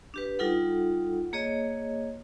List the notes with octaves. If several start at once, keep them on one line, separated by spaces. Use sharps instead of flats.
D4 G4 B4
G3 D#4 F4 A4 F#5
A#3 G#4 C#5 D#5